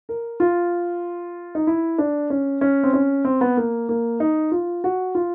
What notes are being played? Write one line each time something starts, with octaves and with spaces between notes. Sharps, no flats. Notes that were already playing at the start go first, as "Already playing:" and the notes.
A#4
F4
D#4
E4
D4
C#4
C#4
C4
C#4
C4
B3
A#3
A#3
D#4
F4
F#4
F4